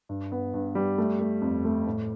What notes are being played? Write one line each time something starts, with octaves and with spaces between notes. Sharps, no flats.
G2
B3
G2
G3
A3
A3
F2
A3
A2